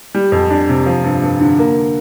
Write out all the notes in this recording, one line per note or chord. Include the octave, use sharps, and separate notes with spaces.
G3
F2
D4
C3
F3
G2
G2
D3
A#3